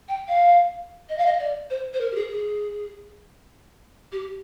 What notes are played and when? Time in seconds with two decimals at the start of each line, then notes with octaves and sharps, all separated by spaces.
0.08 G5
0.28 F5
1.09 D#5
1.18 F5
1.26 D#5
1.39 D5
1.70 C5
1.93 C5
2.01 A#4
2.12 G4
2.15 G#4
2.31 G#4
4.12 G4